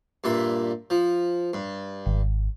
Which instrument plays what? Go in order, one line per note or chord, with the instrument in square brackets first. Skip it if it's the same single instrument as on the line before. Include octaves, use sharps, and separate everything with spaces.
[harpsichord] G2 A#2 E5
F3
G2
[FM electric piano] G#1